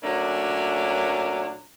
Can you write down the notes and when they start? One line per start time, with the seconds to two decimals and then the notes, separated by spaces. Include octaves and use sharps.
0.04 A#2 F#3 A3 A#3 C#4 D4